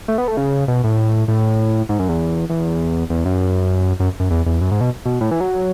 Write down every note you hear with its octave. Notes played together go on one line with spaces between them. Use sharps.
A3
B3
A3
C#3
B2
A2
A2
G#2
F#2
E2
E2
E2
F#2
F#2
F#2
E2
E2
F#2
G#2
B2
B2
A2
E3
F#3